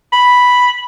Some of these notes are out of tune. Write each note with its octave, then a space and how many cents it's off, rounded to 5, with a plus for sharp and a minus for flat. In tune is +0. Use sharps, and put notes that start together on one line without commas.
B5 +0